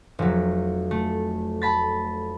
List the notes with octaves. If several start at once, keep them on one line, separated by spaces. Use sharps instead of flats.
F1 F#3
A3
A5 B5 A6